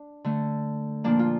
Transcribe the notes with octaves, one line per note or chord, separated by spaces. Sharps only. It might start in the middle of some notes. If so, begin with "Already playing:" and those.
Already playing: D4
D3 A3
A#2 F3 A#3 D4
F4